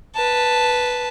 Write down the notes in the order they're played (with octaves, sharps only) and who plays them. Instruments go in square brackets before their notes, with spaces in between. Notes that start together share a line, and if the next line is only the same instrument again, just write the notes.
[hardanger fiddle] B4 A5